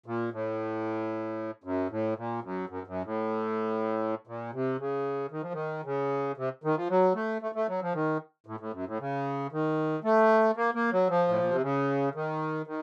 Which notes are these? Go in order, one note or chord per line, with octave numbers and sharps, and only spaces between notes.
A#2
A2
F#2
A2
A#2
F#2
F#2
F#2
A2
A#2
C3
C#3
D#3
F3
D#3
C#3
C3
D#3
F3
F#3
A3
A3
A3
F#3
F3
D#3
A2
A2
F#2
A2
C#3
D#3
A3
A#3
A#3
F#3
F3
A2
A#2
C3
C#3
D#3
D#3